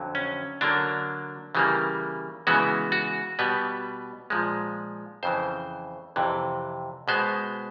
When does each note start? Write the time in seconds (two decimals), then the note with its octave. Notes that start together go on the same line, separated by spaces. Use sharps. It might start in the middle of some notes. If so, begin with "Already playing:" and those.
Already playing: F2 D3 F#3
0.15 C#4
0.61 D3 F#3 A#3 D4
1.55 C#3 E3 G3 A#3
2.47 C#3 E3 G#3 B3 F#4
2.92 F#4
3.39 B2 G3 B3 B4
4.30 A#2 F3 G#3
5.23 F2 C#3 E3 C5
6.16 F2 C3 E3
7.08 B2 G#3 B3 C5